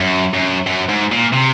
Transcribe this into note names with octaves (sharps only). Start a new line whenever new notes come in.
F#2
F#2
F#2
G#2
A#2
C3